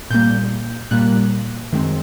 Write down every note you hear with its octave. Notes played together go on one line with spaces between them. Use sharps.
A#2 G3 A#3 G6
A#2 G3 A#3 F#6
F#2 D#3 G#3 C4